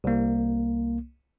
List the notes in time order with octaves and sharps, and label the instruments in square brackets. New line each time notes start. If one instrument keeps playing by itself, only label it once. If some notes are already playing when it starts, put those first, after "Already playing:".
[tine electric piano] C2 A#3